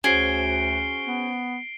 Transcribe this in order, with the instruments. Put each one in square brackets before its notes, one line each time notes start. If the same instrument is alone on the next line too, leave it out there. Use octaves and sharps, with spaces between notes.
[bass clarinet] D2 [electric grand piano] C#4 F#4 C5 [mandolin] G#4 [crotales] C7 D7 G7
[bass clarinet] B3